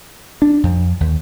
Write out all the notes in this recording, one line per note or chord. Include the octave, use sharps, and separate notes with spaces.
D4
F2
D#2